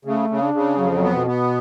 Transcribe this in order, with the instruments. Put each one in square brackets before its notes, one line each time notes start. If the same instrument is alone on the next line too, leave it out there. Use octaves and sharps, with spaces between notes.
[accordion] C#3 [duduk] A3
[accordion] C#3
[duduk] D4
[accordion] C#3
[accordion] F2 [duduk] F#3
[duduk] F3
[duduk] F#3 [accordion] B3
[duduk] B2
[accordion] B3